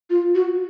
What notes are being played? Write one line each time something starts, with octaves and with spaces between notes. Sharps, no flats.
F4
F#4